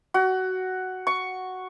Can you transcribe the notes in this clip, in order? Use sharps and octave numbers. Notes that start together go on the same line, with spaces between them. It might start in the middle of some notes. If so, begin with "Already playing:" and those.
F#4
C#6